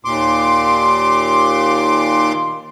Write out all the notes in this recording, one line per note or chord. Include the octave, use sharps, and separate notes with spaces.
D#2 A#2 C6 D6